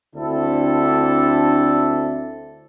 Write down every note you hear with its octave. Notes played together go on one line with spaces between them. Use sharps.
D2 D3 C4 D4 E4 A4